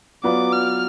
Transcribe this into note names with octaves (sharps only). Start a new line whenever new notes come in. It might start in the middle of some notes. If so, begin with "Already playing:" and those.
F#3 B3 F4 B4 D5 D6
F6